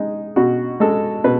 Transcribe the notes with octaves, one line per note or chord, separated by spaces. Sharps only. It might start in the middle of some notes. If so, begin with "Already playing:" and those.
Already playing: G#3 D#4
B2 F#4
G#3 A4
B2 B4